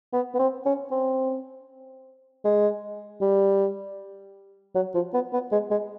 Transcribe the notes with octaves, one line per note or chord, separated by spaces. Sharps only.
B3
B3
C4
C#4
C4
G#3
G3
F#3
F3
B3
B3
G#3
G#3